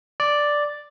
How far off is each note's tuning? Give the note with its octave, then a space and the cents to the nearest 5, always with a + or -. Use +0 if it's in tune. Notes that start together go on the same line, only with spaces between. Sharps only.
D5 +0